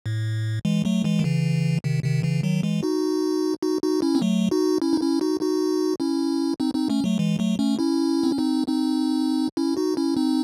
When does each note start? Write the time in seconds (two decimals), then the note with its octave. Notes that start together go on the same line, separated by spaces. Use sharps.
0.06 A2
0.65 E3 G#3
0.85 F#3 A3
1.04 E3 G#3
1.19 D#3
1.24 C#3 E3
1.84 C3 D#3
2.03 C3 D#3
2.23 C#3 E3
2.43 D#3 F#3
2.63 E3 G#3
2.83 D#4 F#4
3.62 D#4 F#4
3.82 D#4 F#4
4.02 C#4 E4
4.15 C4
4.22 F#3 A3
4.51 D#4 F#4
4.82 C#4 E4
4.93 D#4
5.01 C#4 E4
5.21 D#4 F#4
5.41 D#4 F#4
6.00 C#4 E4
6.60 C4 D#4
6.74 C4 D#4
6.90 A3 C#4
7.04 F#3 A3
7.19 E3 G#3
7.39 F#3 A3
7.59 A3 C#4
7.79 C#4 E4
8.23 C4
8.32 C#4
8.38 C4 D#4
8.68 C4 D#4
9.57 C#4 E4
9.77 D#4 F#4
9.97 C#4 E4
10.17 C4 D#4